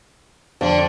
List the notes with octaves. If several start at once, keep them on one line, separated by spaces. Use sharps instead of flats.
F2 D3 D4